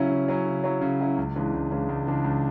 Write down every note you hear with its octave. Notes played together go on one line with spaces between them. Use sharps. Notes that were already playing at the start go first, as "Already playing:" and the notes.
Already playing: C#3 F#3 C#4 E4
C#3
F#3 C#4 E4
C#3
F#3 C#4 E4
C#3
F#3 C#4 E4
C#2
C#3 E3 G#3 D4
C#2
C#3 E3 G#3 D4
C#2
C#3 E3 G#3 D4
C#2